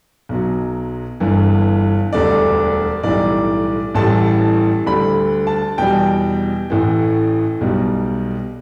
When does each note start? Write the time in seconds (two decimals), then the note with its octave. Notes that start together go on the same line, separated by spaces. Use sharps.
0.29 B1 B2 F#3
1.20 G1 G2 E3
2.13 E1 D2 D3 G3 D5
3.03 B1 A2 E3 G3 D5
3.94 A1 A2 E3 G3 A5
4.86 D2 D3 G3 B5
5.47 A5
5.78 E2 B2 G3 G5
6.70 A1 A2 E3
7.61 B1 B2 G3